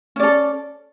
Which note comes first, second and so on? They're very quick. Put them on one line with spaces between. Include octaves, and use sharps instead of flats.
C#4 D5 A4